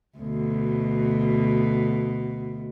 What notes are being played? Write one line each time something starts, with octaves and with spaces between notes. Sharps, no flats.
D2 B2